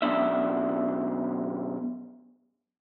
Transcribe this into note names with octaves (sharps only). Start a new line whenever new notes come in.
F#2 B2 D4 E5